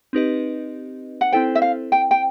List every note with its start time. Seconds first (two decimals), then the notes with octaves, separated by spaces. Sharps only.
0.13 C4 D#4 G4 B4 D#5
1.21 F#5
1.32 C4 E4 A4 C5 G5
1.55 E5
1.62 F5
1.92 G5
2.11 G5